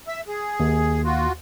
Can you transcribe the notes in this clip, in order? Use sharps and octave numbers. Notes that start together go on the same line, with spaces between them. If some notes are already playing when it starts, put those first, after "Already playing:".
E5 E6
G#4
D#2
F4 F#4